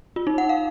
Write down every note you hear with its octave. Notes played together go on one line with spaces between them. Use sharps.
F4
D#4
F#5
F5